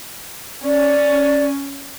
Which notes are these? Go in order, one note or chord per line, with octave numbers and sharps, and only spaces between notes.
C#4 D5